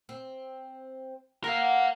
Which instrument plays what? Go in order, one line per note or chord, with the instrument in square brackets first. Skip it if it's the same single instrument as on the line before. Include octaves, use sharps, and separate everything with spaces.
[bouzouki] C4
[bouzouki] A4 F#5 [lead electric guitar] A#4 F5